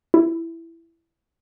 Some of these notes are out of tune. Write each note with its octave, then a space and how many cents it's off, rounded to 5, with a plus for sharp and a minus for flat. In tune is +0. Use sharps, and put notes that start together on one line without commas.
E4 +10